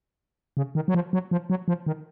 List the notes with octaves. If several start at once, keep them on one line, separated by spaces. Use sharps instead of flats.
C#3
D#3
F#3
F3
F#3
F3
F#3
F3
D#3